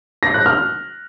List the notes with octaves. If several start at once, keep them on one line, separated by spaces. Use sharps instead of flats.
A#6
F#6
F6